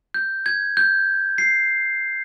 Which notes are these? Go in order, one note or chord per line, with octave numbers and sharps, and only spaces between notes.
G6
G#6
G6
C7